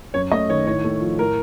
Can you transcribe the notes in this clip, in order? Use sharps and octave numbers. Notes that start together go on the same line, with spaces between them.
F#2 C#5
A3 D#5
D#3 C#5
A2 C#5
A3
F3
A2 A#4